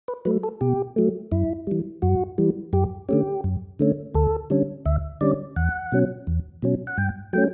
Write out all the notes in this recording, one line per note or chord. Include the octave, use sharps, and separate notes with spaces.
B4
F#3 A3 B4
A4
B2 G4
F#3 A3
F#2 E4
E3 G3
F#2 F#4
E3 G3
F#2 G4
D3 A3 C#4 G4
F#2
D3 A3 C#4
D2 A4
D3 G3 C#4
D2 E5
D3 G3 C#4 D5
E2 F#5
B2 F#3 C#4
E2
B2 F#3 C#4
F#5
G2 G5
F#3 A3 C#4 G5